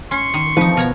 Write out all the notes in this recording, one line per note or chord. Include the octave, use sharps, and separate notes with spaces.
C#4 C6 C#6
D#3
E3 F3 C4 D#4 B4
B2 B3 A#4 C#5 A#5